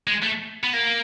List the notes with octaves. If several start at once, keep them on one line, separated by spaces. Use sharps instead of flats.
G#3
A3
B3
A#3